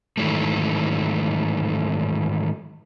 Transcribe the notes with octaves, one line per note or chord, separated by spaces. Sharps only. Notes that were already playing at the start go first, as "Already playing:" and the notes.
G#2 D#3 E3 F#3 A3